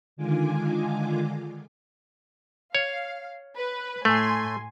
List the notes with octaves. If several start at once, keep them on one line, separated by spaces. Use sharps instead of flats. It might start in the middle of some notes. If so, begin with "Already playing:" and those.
D3 D#3 G#3 F4 G#5 D6
C#5 F5
B4
A2 A3 G#5 C6